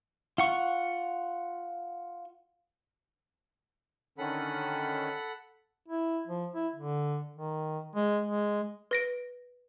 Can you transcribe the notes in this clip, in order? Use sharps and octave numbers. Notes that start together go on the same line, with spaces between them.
F4 F#5 C#6
D3 D#3 C#4 A4 F#5 B5
E4
F3
E4
D3
D#3
G#3
G#3
B4 A#6 D7